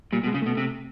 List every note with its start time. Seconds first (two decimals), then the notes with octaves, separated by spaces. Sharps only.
0.13 A#2 G3
0.24 B2
0.27 G#3
0.34 C#3
0.42 B2 A3
0.57 C3